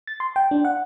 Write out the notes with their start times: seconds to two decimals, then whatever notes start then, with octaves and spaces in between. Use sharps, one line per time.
0.07 A6
0.20 C6
0.36 G5
0.51 D4
0.65 F#5